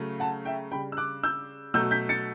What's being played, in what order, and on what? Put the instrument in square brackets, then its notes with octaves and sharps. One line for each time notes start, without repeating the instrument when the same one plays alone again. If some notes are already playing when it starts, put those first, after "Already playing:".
Already playing: [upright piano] C#3 F#3 A3
F#5 A5
E5 G5
C#3 G3 G5 B5
E6
D6 F#6
E6 G6
B2 F#3 A3 E6 G6
G6 B6
A6 C#7